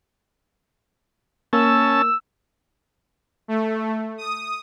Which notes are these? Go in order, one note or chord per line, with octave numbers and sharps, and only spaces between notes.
A#3 C#4 A5 E6
A3
D#6